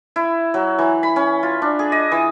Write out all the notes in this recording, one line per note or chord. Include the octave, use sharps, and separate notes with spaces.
E4
F#3
E3
B5
C#4
F4
D4
G#4
D#5
E3